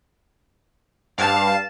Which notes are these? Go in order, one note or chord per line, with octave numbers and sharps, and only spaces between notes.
G2 F5 A5